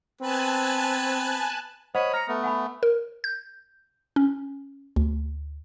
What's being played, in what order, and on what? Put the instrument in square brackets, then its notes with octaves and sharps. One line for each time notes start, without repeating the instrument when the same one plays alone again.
[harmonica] B3 B4 [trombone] C4 [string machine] G#5 A5 F#6
[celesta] C5 D#5 F#5 [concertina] C#5 B5 D#6
[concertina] A#5 [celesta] F6 A#6 C#7
[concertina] A3 B3
[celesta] F#5 G#5 B5
[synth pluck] A#4
G6
C#4
D2